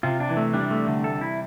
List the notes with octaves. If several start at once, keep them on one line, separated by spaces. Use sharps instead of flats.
C3 F4
D4
E3
A3
G3 D4
A3
D3
A4
E4